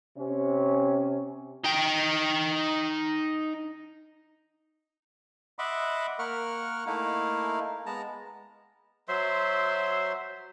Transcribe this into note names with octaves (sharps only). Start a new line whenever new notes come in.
C3 C#4
D#4 G5
D#5 E5 F#5 B5 C6 D6
A#3 A#4 F#5 C#6 F6
A3 A#3 D#4 E4 F5
G#3 B3 A5 A#5
F#3 C5 E5 C6